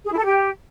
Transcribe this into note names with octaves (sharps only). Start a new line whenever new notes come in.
G#4
E4
A4
G4